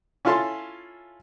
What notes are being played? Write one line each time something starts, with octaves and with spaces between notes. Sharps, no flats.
C#4 E4 F4 A4 A5 C6